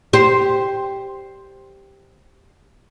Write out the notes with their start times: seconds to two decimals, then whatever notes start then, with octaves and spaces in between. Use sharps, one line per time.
0.13 G4 C5